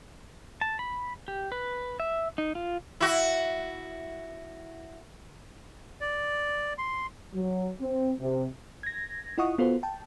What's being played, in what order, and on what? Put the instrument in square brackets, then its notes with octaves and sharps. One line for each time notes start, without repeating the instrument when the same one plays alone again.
[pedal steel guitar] A5
B5
G4
B4
E5
D#4
F4
[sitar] E4 F#4
[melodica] D5
C6
[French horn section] F#3
C4
C3
[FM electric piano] G#6 A#6
E4 F4 D#5 F#5 C#6 D#6
B3 F4 F#4 A4 C5
G5 A5